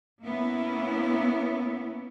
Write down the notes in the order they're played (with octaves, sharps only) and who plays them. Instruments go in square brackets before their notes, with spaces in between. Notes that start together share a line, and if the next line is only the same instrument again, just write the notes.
[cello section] A#3 B3 C#4 E4